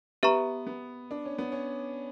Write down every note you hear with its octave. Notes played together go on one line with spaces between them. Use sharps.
B3 G4 B4 E5 A#5 C#6
B3
D4
C#4
B3
C#4